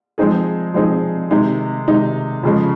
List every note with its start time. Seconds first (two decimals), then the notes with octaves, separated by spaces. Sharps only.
0.18 F3 G#3 C4 D#4 G#4
0.74 F3 G#3 C4 D#4 G#4
1.31 C3 D#3 G#3 D#4
1.88 C3 D#3 G#3 D#4
2.43 F2 C#3 F3 G#3